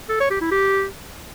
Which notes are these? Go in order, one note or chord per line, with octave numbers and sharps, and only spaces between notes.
A4
C#5
G4
E4
G4